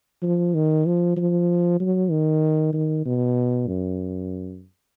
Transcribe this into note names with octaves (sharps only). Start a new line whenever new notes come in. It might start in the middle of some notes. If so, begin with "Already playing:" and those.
F3
D#3
F3
F3
F#3
D#3
D#3
B2
F#2